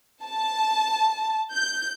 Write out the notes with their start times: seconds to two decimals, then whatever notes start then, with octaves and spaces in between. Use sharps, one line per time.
0.24 A5
1.52 G6